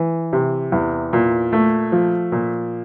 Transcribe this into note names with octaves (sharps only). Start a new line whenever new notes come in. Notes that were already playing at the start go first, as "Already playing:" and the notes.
Already playing: E3
C3
E2
A#2
A3
F3
A#2